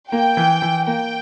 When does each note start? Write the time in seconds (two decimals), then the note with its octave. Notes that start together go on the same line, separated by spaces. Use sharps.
0.12 A#3 G5
0.37 E3
0.62 E3
0.87 A#3 G5